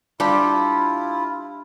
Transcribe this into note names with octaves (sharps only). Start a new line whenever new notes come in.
G3 D4 E4 F4 G4